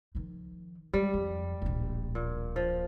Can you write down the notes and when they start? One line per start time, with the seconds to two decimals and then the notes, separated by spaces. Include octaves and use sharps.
0.15 D#3 F3
0.94 G3 G#3
1.14 F2
1.62 D1 A#1
2.15 A#2
2.56 F3